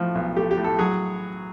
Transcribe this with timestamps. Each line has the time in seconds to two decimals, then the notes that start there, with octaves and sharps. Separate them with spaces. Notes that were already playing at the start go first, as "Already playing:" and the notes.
Already playing: A2 F3
0.15 B1
0.36 A3 G4
0.51 G4
0.58 A2
0.64 A4
0.78 F#3 G#4